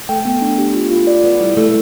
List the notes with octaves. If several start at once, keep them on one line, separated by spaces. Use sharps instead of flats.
A3 G5
B3
D4
G4
F4
F4
D5
B3 B4
G3 E4
A3 E4